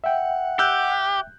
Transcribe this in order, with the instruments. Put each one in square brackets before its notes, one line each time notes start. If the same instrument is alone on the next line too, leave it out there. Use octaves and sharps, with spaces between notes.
[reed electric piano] E5 G5 [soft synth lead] F#5
[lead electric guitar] G4 [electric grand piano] E6 F#6 G6